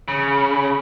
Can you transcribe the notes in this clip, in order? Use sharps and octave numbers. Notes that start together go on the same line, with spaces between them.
C#3